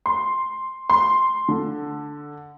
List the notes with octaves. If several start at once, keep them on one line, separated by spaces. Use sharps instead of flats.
C6
C6
D3